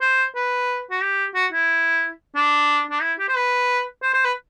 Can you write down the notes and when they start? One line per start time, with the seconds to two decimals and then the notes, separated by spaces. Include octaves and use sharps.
0.01 C5
0.35 B4
0.91 F#4
1.02 G4
1.35 F#4
1.52 E4
2.35 D4
2.90 D4
3.02 E4
3.19 G4
3.28 C5
3.36 B4
4.02 C5
4.14 C5
4.24 B4